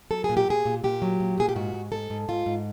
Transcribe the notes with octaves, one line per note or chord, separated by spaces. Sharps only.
F#3 A4
G#4
A#2
G4
A#2 G#4
A#2
A#2 G4
F#3
A#2
A#2 G#4
G4
G#2 F#4
G#2
G#2 A4
G#2
G#2 F4
G#2